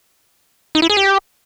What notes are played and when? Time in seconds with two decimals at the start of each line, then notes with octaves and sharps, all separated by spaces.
0.75 D#4
0.82 E4
0.90 G#4
0.97 G4